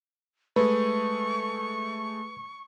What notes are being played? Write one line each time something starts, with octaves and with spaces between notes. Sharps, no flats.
G#3 A3 B4 C#6